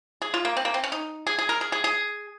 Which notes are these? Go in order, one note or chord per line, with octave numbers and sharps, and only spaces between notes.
G#4
F4
A#3
C4
A#3
C4
C#4
D#4
G#4
G#4
A#4
G#4
G#4
G#4